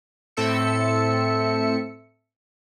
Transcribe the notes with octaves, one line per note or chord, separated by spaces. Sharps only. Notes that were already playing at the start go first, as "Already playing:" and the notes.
A2 C4 A4 E5 E6 C#7